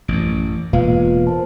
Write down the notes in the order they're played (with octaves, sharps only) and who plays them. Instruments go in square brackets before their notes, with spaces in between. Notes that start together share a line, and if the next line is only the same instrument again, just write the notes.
[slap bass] A1 F#2 [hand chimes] D7
[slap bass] E1 A#2 G#3 [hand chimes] F4 B4 F5
[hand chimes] A#4 C5 A5